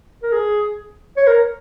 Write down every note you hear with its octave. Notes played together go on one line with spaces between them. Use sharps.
A#4
G#4
C#5
A#4